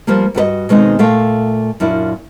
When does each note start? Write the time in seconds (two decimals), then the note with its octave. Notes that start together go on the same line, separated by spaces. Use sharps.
0.07 F3 G3 A#3
0.35 G2 F#4 B4 D#5
0.69 B2 D#3 G#3 B3 C4 D#4
0.99 A#2 A3 F5 G5
1.80 F#2 A#2 D4 E4